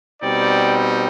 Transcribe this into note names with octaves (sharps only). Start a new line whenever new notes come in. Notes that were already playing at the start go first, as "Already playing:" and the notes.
B2 G3 C4 D#4 D5